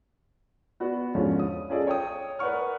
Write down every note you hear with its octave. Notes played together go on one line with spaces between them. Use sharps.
B3 F#4 D5
E2 G#2 D3 F3 C#4 D4
D#6
C#4 F4 G#4 A4 D5 D#5
C#5 G5 D#6
A#4 B4 D5 F#5 C#6 F6